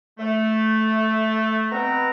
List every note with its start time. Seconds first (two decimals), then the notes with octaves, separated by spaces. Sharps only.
0.19 A3
1.72 B2 B3 C4 B4 F#5 A#5